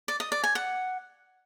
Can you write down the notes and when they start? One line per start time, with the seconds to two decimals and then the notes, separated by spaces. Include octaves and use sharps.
0.08 D5
0.20 D#5
0.32 D5
0.44 G#5
0.55 F#5